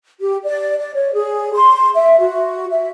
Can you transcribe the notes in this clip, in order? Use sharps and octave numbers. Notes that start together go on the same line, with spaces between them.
G4
D5
D5
C#5
G#4
C6
E5
F#4
E5